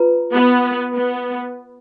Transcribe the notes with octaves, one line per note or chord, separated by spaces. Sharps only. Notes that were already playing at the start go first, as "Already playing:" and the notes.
Already playing: F4 B4 A#5
B3
B3